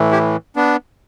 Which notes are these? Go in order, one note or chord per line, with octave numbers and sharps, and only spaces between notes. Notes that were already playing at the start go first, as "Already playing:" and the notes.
Already playing: A2 E3
E4 G4
B3 D4